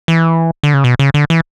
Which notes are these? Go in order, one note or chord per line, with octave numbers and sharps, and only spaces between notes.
E3
D3
C#3
B2
C#3
D3
E3